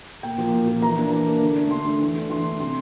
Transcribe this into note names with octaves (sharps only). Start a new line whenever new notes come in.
A#2 G5
F3 A#3
A#2
F3 A#3
E3 A#5
A#3 D4
E3
A#3 D4
D3
A3 D4
D3 C6
A3 D4
E3
A3 D4
E3 C6
A3 D4
C3 C6